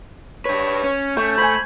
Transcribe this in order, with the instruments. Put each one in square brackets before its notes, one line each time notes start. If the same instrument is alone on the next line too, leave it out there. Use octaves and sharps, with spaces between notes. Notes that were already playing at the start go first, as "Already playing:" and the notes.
[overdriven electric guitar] D4 B4 [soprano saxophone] C#5
[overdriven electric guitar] C#4
[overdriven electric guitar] A3 [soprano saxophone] C#4 [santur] G5 C#6
[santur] C5 G#5 [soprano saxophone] B5